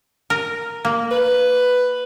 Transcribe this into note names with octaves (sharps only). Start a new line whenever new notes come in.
A#4
A#3
B4